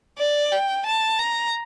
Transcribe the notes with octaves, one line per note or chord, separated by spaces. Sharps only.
D5
G5
A5
A#5